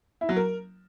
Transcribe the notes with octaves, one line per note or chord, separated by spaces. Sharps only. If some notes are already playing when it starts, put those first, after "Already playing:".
E4
F#3
A#4